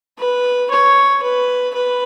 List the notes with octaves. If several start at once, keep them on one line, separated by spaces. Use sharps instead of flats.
B4
C#5
B4
B4